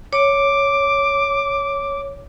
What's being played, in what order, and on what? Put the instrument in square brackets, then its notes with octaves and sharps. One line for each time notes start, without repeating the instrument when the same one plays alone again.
[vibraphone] C#5 [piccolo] D6